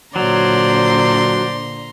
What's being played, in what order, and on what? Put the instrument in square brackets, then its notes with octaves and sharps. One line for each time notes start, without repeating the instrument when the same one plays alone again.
[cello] A#2 D3 [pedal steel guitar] F#3 [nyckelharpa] C5 D5 [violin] A#5 C6